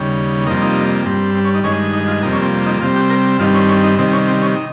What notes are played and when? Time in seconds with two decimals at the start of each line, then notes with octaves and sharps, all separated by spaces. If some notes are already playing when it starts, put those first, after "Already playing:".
Already playing: D#2 C#3 G3
0.47 F2 C3 G3 A#3 D#4
0.62 D#4
1.06 G2 G3 C4
1.35 C4
1.45 C#4
1.55 D#4
1.64 G2 D#3 G#3 C#4
1.93 D#4
2.08 F4
2.23 F2 C3 G3 A#3 D#4
2.33 C#4
2.42 C4
2.66 D#4
2.81 C3 G3 C4 F4
2.96 G4
3.10 A#4
3.39 G2 D#3 G3 C4 F4
3.54 C#4
3.69 C#4
3.84 D#4
3.98 C3 D#3 G3 C4
4.13 C#4
4.28 C4
4.42 C#4
4.56 D#4